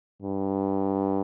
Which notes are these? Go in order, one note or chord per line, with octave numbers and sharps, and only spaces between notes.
G2